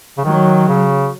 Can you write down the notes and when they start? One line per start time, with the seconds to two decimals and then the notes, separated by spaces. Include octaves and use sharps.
0.18 C#3
0.24 D#3 F#3
0.68 C#3